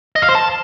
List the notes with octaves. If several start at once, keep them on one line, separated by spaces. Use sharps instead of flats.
D#5
F5
C5
A5